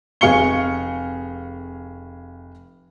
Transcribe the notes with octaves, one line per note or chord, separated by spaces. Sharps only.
F1 G#4 F5 C#6 C#7 G7